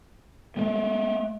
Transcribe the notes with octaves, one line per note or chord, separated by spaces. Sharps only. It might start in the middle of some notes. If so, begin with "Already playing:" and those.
G#3 A3